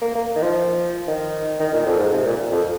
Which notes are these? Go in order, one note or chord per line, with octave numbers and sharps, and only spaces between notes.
A#3
A#3
D#3
F3
D#3
D#3
A#2
F2
G#2
C3
A#2
F2